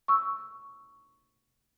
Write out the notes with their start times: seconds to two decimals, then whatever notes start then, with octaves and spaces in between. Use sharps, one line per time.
0.08 C#6 E6